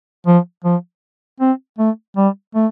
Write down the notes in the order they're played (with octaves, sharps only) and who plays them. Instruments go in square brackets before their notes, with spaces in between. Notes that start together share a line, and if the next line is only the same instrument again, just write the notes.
[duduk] F3
F3
C4
A3
G3
A3